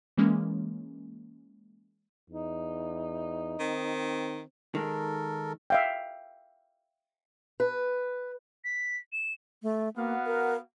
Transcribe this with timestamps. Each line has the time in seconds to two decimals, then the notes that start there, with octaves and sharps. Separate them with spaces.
0.18 E3 G#3 A#3 C#4
2.30 E2 D#4
3.60 D#3 C4
4.75 D#3 G#3 A4 A#4
5.70 E5 F5 G5
7.60 B4
8.64 B6
9.12 E7
9.63 A3
9.96 A#3 B3 F#4 F5
10.26 A#4